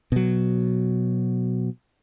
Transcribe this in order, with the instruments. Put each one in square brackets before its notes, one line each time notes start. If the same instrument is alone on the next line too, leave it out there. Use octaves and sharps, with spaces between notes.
[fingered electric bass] B2 F#3